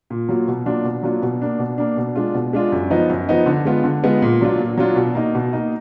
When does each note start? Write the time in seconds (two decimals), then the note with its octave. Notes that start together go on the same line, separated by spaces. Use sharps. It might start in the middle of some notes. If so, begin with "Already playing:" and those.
0.10 A#2
0.29 F#3 A#3 F4
0.48 B2
0.66 F#3 A#3 D4 F4
0.84 B2
1.03 F#3 A#3 D4 F4
1.22 B2
1.41 A#3 D4
1.59 B2
1.78 A#3 D4
1.97 B2
2.16 G#3 D4 F4
2.34 B2
2.53 G#3 D4 F4
2.72 F#2
2.90 F3 B3 D#4
3.09 F#2
3.29 F3 B3 D#4
3.46 D3
3.65 G#3 B3 F4
3.84 D3
4.04 G#3 B3 F4
4.22 A#2
4.41 F#3 D4 F4
4.59 A#2
4.77 F#3 D4 F4
4.96 B2
5.15 A#3 D#4
5.35 B2
5.53 A#3 D#4